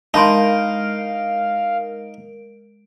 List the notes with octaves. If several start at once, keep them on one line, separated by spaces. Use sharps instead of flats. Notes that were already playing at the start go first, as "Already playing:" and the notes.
G#3 D#4 A#4 F5 A5 B5 C6 D7